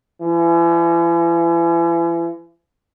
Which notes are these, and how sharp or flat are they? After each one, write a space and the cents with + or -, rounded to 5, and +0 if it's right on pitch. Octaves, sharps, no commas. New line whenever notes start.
E3 +40